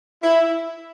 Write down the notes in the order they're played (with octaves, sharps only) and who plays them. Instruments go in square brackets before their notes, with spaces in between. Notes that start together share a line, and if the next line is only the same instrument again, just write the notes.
[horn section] E4